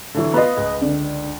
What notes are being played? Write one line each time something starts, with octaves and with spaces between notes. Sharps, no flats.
D3 E3 F#3
B3 F4 B4 D#5
C#2
D3